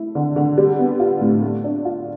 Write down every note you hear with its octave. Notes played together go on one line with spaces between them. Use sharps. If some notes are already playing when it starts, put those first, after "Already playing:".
Already playing: A3 E4
D3
D3
G3
B3
F4
A2
A3
D4
F4